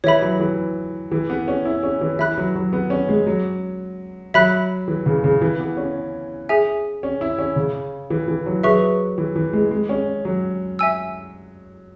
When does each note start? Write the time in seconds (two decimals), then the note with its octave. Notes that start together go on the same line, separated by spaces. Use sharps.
0.04 E3 C#5 E5 B5
0.22 F#3
0.40 E3
1.12 E3
1.30 B3
1.48 C#4
1.65 E4
1.83 C#4
2.01 E3
2.19 E3 E5 B5 F#6
2.38 F#3
2.55 F#3
2.73 B3
2.90 C#4
3.09 G#3
3.26 F#3
4.34 F#3 E5 B5 F#6
4.88 E3
5.06 C#3
5.24 C#3
5.42 E3
5.59 B3
5.77 C#4
6.49 G#4 E5 G#5
7.03 C#4
7.21 E4
7.39 C#4
7.56 C#3
8.10 E3
8.28 E3
8.46 F#3
8.63 F#3 G#4 B4 E5 C#6
9.18 E3
9.36 E3
9.53 G#3
9.71 G#3
9.89 C#4
10.25 F#3
10.79 E5 G#5 E6